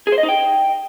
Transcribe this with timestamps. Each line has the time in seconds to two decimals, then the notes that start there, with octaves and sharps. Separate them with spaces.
0.07 G#4
0.12 C5
0.18 D#5
0.23 D#4
0.29 G5